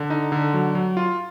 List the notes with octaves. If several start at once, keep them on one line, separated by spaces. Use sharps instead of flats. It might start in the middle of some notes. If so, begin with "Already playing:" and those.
Already playing: D3
D#4
D3
F#3
F#3
F4